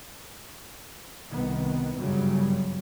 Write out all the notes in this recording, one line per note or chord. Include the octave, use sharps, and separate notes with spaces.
C2 D#3 B3
G1 F#2 C#3 F#3 G3